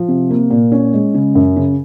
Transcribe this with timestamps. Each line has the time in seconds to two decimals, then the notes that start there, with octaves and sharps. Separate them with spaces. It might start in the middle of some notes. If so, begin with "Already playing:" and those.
Already playing: F3
0.08 C3
0.30 A#3
0.51 A#2
0.72 C#4
0.93 G#3
1.14 C#3
1.35 F#2
1.56 C#3